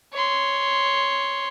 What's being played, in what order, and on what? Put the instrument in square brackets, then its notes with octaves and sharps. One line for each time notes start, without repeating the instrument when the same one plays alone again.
[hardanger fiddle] C#5 C6